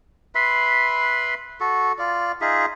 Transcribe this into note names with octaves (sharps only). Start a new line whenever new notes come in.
B4 E5 B5 C6
F#4 A4
F4 D5
D#4 F4 G#4 E5